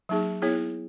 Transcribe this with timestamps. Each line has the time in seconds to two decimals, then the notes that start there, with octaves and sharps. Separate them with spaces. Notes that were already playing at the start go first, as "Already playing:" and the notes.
0.09 F#3 A#3 D#4 G#4
0.42 B3 E4 G#4 C#5